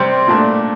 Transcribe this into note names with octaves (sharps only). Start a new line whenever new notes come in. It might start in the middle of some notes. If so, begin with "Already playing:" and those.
Already playing: C3 G3 C4
A#2 A3 D4